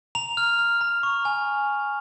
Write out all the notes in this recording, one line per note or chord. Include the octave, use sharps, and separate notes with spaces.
A#5 F7
F6
F6
A#5
C#6
G#5